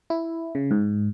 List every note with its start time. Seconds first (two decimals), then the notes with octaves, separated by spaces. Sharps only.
0.10 E4
0.55 C#3
0.71 G#2